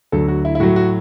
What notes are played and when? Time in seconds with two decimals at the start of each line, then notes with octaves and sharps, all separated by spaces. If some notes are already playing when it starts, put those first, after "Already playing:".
0.12 D2 D3 F#3 A3 A4
0.28 F#4
0.45 E4
0.55 E4
0.60 A2 F#3 A3 F#4
0.76 F#4